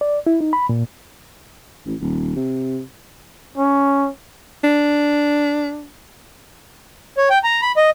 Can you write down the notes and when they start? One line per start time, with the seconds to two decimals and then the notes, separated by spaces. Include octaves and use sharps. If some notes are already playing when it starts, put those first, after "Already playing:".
0.01 D5
0.27 E4
0.41 D#4
0.53 B5
0.69 A#2
1.86 A1
2.01 D#1
2.36 C3
3.57 C#4
4.64 D4
7.17 C#5
7.30 G5
7.44 A#5
7.62 B5
7.77 D#5